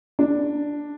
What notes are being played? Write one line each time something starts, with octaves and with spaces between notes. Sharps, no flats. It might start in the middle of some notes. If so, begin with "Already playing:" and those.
D4